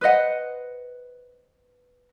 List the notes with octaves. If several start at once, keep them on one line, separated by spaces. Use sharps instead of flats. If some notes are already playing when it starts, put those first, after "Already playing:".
B4 C5 D#5 F#5